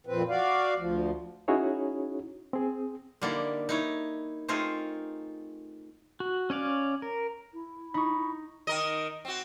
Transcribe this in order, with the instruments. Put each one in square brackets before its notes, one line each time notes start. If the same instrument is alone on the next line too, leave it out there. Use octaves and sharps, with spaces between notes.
[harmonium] F2 A#2 C4 B4
F#4 D5 F5
D2 F3
[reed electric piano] C#4 D#4 E4 F#4 G#4 C#5
C4 G#4
[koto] D3 G3 A#3 D#4 E4 D5
D#4 E4 C#5
A3 C4 D#4 F4 G#4 A#4
[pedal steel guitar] F#4
C#4 C#5 D5 F5
A#4
[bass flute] E4
[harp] D#4 [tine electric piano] B5 C#6
[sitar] D#3 A#4 D#5
C4 F#4